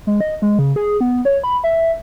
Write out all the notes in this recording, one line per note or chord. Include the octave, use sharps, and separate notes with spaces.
G#3
D#5
G#3
C#3
G#4
B3
C#5
B5
E5